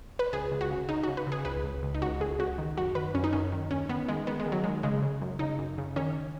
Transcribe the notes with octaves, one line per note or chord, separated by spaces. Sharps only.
B4
C#2 G#4
C#2
F#4
C#3
C#3 D#4
C#3 F#4
B4
C#3 G#4
C#2 B4
C#2
C#2
D#4
C#2 F#4
C#2 G#4
C#2 F#4
D#3
F#2 F#4
D#3 B4
F#2 C#4
D#4
F#2 C#4
D#3
D#2 C#4
D#3 B3
D#3 G#3
D#3 B3
G#3
D#3
F#3
D#3 G#3
C#3 G#3
C#3
F#2
C#3 D#4
F#2
C#3
D#3 C#4